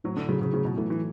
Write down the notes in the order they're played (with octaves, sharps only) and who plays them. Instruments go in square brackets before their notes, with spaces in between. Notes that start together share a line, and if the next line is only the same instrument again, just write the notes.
[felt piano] A2 [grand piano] F#3
[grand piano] D3
[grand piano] C#3 [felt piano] F#3
[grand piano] C#3
[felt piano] A2 [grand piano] C#3
[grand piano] B2
[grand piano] E3 [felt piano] A3
[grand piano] E3